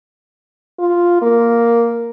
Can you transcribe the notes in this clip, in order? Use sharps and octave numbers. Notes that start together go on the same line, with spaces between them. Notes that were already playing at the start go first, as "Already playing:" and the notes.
F4
A#3